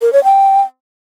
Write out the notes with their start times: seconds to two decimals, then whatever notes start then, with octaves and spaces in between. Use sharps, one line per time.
0.02 A#4
0.13 C#5
0.24 G5